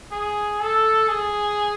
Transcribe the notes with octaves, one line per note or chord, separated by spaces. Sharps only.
G#4
A4
G#4